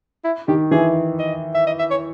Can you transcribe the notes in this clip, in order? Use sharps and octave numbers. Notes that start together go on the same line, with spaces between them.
E4
D#3 G4
E3 G#4
D#5
E5
D#5
E5
C#5